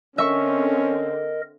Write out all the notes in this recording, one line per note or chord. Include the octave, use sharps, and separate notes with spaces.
D3 C4 C#4 A#4 D#5 E5 C#6